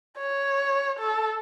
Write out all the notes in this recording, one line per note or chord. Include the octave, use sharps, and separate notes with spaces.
C#5
A4